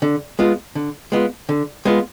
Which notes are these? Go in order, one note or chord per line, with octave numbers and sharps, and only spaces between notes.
D3
G#3 B3 F4
D3
G#3 B3 F4
D3
G#3 B3 F4